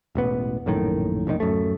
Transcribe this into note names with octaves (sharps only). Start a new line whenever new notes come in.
E1 A1 B3
A#1 F#2 A2 D#3
F1 A#1 C3 D#3
D1 F#2 A3